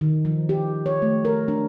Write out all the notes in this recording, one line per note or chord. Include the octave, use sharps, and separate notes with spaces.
D#3
F3
G4
C#5
A3
A#4
D4